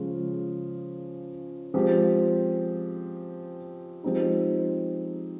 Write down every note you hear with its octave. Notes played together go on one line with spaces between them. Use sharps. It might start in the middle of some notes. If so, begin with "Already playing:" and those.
Already playing: C#3 F3 G#3 C#4 F4
F3 G#3 C4 G4
F3 G#3 C4 D#4 G4